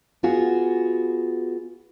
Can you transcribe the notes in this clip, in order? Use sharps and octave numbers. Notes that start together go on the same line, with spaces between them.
B3 F4 F#4 G#4